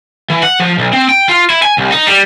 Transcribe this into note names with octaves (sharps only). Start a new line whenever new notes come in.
E3
F#5
F3
B1
C4
G5
F4
E4
G#5
C2
D#4
G3